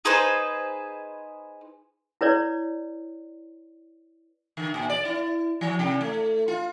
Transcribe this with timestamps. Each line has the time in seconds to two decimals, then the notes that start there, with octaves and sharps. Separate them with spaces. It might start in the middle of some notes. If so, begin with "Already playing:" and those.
0.05 D#4 G#4 B4 C5
2.21 E4 B4 C#5 D5
4.57 D3
4.74 A#2
4.90 D5
5.05 E4
5.61 F3
5.79 C3
6.01 A3
6.48 F4